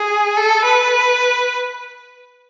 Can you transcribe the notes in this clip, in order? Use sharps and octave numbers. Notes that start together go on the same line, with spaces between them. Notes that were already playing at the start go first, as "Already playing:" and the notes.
Already playing: G#4
A4
B4